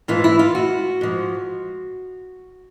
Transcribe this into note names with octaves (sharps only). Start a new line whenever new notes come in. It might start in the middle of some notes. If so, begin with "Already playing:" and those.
G#2 E3 F4
E4
F4
F#4
G#2 F3